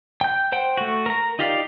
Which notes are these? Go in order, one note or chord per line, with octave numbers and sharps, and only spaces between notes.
G5 G6
C5 F#5 G5
A3 F#4
A#4 A#5
D#4 F4 G4 D5 F5